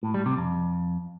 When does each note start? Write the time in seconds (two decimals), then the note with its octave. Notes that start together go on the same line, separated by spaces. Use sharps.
0.03 A2
0.14 G3
0.26 C3
0.37 F2